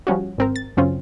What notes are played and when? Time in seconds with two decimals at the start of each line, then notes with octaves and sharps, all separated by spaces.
0.07 F3 G3 C#4 F#4
0.38 G#1 C4 A#4
0.56 A6
0.77 F#2 C#3 C4 C#4 F4